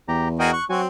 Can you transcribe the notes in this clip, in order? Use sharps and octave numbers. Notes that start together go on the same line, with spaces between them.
E2 G4 A#5
F#4 G#4 A#4 D#5 G5
C#6 F#6
F#3 C4 F#4 G#5 C#6